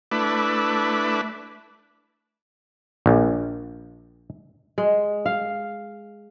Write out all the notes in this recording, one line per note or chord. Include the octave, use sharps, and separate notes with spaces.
A3 D4 E4 B4
A#1
G#3
F5